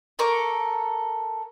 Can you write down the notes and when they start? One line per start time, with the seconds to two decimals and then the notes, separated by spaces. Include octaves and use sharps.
0.19 A4 A#4 C#6 D6